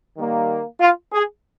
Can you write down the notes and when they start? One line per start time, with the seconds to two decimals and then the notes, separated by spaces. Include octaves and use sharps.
0.18 D#3 G3 A#3
0.81 F4
1.13 G#4